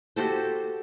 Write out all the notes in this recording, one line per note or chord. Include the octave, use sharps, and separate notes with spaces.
F#4 G4 A4 C5